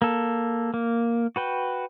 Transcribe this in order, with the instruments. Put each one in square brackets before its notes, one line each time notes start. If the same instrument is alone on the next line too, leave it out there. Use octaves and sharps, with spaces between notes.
[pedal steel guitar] A#3 A4
A#3
F#4 B4 G5